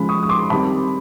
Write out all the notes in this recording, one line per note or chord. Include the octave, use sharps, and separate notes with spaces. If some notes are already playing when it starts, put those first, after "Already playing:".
Already playing: C#3 F3 G#3 B5
C#6 D#6
D#6
C6 D6
D#3 G3 C4 A5 B5